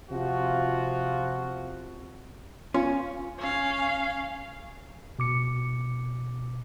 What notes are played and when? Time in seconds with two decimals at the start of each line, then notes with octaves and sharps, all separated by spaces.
0.10 C3 F3 F4 F#4
2.74 C#4 F4
3.38 C#4 F5
5.19 B2 D6 C#7